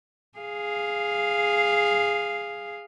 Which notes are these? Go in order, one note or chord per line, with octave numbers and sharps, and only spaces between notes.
G#4 F5